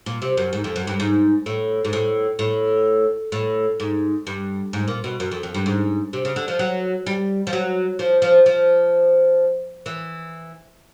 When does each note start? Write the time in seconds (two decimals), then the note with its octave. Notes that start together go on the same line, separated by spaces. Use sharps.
0.06 A#2
0.22 C3
0.37 F#2
0.53 G#2
0.64 F2
0.76 F#2
0.87 G2
1.00 G#2
1.46 A2
1.85 G#2
1.93 A2
2.39 A2
3.32 A2
3.80 G#2
4.27 G2
4.73 G#2
4.88 A#2
5.04 B2
5.20 F#2
5.31 F2
5.43 F2
5.54 G2
5.66 G#2
6.13 C3
6.25 C#3
6.36 D3
6.48 F3
6.59 F#3
7.06 G3
7.47 F3
7.53 F#3
7.99 F3
8.22 F3
8.46 F3
9.86 E3